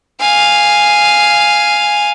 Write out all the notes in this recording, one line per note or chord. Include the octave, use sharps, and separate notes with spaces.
F5 G#5